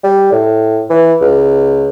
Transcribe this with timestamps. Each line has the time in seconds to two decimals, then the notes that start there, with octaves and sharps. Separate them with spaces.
0.04 G3
0.32 A2
0.90 E3
1.21 C#2